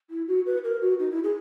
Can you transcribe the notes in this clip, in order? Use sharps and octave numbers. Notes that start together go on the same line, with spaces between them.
E4
F#4
B4
A#4
F#4
D#4
E4
G#4